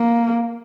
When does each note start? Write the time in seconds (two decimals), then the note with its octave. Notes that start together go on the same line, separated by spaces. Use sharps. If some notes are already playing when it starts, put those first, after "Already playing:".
Already playing: A#3